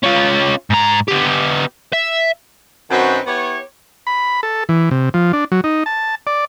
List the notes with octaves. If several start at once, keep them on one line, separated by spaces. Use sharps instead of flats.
C#4 F4
G#2 A#5
B3 G4
E5
F#2 D#3 F#3 C4 F#4 B4
B3 E4 G4 C#5
B5
A4
E3
C3
F3
D4
F#3
D#4
A5
D5